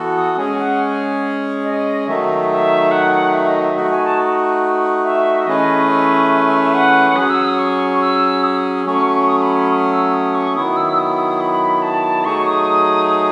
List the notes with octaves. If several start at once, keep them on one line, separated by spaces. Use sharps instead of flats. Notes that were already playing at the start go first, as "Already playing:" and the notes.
Already playing: E3 B3 F#4 A4
D#6
G#3 C#4 G#4 G#5
F#5
D#5
D#3 F#3 A3 D#4 E5
E5
F#5
E5
D#5
E5
A3 D#4 F#4 E5
G#5
A5
E5
E3 A3 C#4 G#4 B4 D#5
E5
E5
E5
E5
F#5
F#3 C#4 G#4 D#6
E6
D#6
C#6
E6
D#6
F#3 A3 C#4 C#6
D#6
B5
B5
D#6
E6
D#6
C#6
D#3 F#3 B3 E4 D#6
E6
E6
D#6
B5
A5
F#3 A3 D#4 G#4 C#6
D#6
D#6